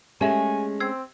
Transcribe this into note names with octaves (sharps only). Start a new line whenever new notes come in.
G#3 A3 C#4 G4 E5 G#5 E7
C4 E6 G#6 C7